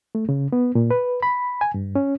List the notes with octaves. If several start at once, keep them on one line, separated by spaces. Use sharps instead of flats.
A3
C#3
B3
A#2
B4
B5
G#5
G2
C#4